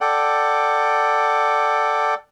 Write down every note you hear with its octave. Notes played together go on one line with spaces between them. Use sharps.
A4 D5 F#5 G5